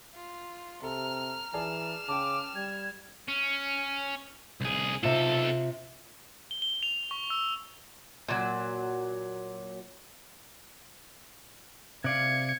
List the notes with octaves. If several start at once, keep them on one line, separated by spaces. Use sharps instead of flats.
F4
C3 A4 A#5 F6
E3 G#4 D5 A5 F6 E7
C#3 G5 A5 D6
G3 G#6
C#4
C2 G#4
B1 C3 F4 A4
G7
G7
F7
C#6
E6
A#2 F#3
C3 D5 F5 G#6 C#7